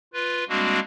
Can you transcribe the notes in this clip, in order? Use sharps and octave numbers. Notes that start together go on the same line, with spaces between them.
F4 B4
G3 G#3 A#3 C4 D4 F#4